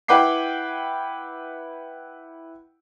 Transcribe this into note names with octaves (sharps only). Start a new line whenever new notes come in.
E4 B4 F#5 G5 D6 C7